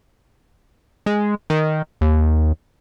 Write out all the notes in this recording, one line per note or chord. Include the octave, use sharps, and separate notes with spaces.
G#3
D#3
D#2